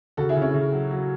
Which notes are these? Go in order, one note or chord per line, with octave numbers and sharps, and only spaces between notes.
C#3 F#4 A4
E4 G#4
C#3
C#4 E4
C#3
F#3
F#3